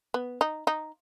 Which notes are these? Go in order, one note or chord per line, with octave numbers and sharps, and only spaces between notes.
B3
D#4
D#4